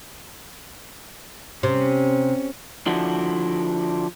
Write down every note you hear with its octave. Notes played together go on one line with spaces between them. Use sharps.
C3 C#4
D3 F3 D4 E4 F#4